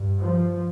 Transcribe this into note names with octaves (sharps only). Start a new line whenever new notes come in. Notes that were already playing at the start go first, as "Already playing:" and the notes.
Already playing: G2
F3